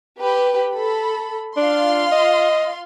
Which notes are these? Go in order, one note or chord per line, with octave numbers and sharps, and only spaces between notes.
G4 B4
A4 B5
D4 F4 F5 C6
D#5